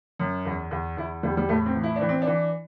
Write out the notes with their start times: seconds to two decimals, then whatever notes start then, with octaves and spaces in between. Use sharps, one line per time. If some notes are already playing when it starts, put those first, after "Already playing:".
0.19 F#2
0.45 E2
0.71 E2
0.97 E2 E4
1.23 E2 G3
1.37 G3
1.49 A2 A3
1.66 C4
1.75 E3
1.83 E4
1.96 D4
2.01 E3
2.09 C4
2.22 D4
2.27 E3